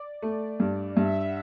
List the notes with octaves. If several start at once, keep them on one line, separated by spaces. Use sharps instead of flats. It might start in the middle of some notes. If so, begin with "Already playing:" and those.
Already playing: D5
A3
G2
G2 E5
F#5